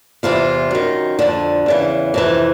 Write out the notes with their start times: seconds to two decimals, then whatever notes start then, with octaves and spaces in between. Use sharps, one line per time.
0.23 E2 C3 E3 F4
0.71 F#2 D#3
1.19 F2 D3
1.66 E2 C#3 E3
2.14 F2 C3 E3